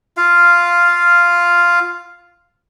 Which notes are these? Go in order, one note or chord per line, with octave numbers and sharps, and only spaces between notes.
F4 F5